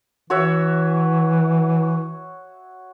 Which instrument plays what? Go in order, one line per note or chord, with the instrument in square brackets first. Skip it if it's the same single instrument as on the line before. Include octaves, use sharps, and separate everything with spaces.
[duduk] E3 [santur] F#4 C#5 E5